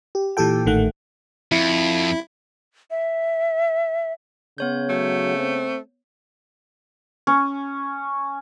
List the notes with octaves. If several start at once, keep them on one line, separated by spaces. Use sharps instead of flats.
G4
A#2 E3 G4 A4 G5
A1 D#3 A3 F#5
F2 E4
E5
C#3 B3 C#5 G6
F#3 A3
C4
C#4